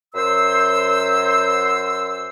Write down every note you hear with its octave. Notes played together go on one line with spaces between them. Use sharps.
F#2 C5 E6